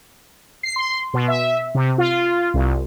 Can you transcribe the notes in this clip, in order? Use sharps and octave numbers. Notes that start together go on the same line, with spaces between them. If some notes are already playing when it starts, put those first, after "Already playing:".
C7
C6
B2
E5
C3
F4
C2